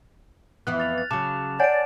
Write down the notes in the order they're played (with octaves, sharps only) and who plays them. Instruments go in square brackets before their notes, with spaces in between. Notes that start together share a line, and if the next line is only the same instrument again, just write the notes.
[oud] F2 E3 B3 [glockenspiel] F#6
[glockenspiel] F6 A6 F7
A6
[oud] C#3 F#3 [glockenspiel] A5 D6 E7
[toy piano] C#5 F#5 G#5 [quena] D5 [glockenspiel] A6 D7